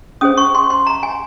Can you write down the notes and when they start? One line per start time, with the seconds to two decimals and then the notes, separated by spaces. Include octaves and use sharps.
0.21 C#4 G#4 C5 D#6
0.37 C#6
0.55 C6
0.70 C6
0.87 A#5
1.03 G#5